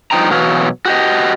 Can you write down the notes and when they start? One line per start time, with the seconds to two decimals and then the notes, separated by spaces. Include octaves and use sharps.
0.11 G2 F3 D#4 G5 A#5
0.31 B2 E3 F#3 F#4 F5
0.85 F#4 G4 D#5